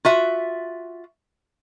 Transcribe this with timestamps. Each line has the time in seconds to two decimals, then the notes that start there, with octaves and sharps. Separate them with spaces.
0.05 F4 F#4 E5